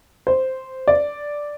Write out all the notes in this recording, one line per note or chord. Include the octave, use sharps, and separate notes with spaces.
C5
D5